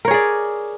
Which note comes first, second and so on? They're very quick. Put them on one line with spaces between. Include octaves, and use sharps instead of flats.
A#4 C#5 G#4 D5